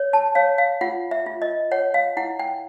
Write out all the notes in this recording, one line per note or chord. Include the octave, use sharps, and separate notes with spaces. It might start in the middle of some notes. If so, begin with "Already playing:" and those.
Already playing: C#5
A5
C#5 F5
F5
F4 F#5
E5
F4
D#5
C#5 F#5
F5
E4 F#5
G5